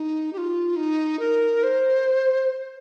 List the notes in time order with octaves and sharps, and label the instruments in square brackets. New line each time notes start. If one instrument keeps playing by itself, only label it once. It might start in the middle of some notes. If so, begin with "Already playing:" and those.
Already playing: [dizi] D#4
G4
F4
D#4
A#4
C5